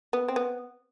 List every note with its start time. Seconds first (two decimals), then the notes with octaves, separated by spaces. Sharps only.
0.13 B3
0.28 C4
0.36 B3